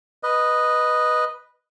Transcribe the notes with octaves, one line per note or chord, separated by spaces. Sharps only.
B4 D#5